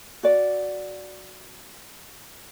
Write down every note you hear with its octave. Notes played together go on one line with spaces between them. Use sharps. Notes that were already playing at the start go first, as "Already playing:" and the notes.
F#4 D5